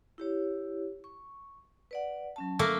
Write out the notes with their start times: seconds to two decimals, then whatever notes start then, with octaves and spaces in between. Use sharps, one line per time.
0.18 E4 G4 C#5
1.04 C#6
1.91 B4 D5 F#5
2.36 F#3 C#4 A5
2.59 A3 A#3